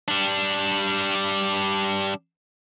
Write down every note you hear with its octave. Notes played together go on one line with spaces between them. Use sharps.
G3 D4